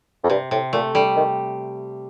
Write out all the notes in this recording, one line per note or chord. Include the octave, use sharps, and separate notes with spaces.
F2
G2 C3
A2 C3
A#2 A3
D3 G3
D#3